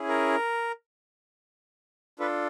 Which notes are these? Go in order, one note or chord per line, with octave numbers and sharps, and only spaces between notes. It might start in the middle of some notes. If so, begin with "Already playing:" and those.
Already playing: C#4 E4 G#4
A#4
D4 F4 A4 B4